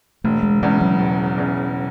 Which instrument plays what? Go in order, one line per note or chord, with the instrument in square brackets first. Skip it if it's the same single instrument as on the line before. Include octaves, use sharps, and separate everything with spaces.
[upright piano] E1 [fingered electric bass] A3
[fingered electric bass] G#3
[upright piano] E2 C#3 [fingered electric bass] G#3
[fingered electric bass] F#3
[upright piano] E1
E2 C#3